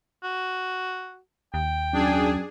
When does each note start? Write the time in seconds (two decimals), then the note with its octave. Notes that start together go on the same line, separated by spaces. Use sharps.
0.23 F#4
1.54 D#2 G5
1.93 F#2 D4 G#4